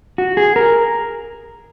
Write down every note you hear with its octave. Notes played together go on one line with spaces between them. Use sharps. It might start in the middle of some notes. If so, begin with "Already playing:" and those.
F#4
G#4
A#4